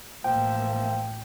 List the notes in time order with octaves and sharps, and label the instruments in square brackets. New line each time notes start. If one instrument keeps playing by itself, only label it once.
[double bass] A1 [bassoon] F3 [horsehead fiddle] A#3 E5 [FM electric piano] G5